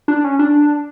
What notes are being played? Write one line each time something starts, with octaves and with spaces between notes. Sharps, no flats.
D4
C#4
D4